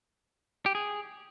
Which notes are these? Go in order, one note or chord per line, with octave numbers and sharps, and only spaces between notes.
G4
G#4